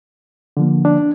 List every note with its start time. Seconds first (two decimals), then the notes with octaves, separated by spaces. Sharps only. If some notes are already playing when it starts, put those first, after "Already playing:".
0.57 D3 F3 A#3
0.85 D4